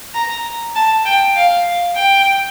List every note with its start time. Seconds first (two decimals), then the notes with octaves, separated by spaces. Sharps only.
0.14 A#5
0.75 A5
1.05 G5
1.35 F5
1.95 G5